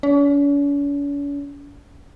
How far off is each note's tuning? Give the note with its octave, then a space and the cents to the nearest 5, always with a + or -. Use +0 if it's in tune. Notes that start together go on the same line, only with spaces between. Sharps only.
C#4 +45